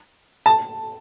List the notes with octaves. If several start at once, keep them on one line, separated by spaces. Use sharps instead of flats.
A5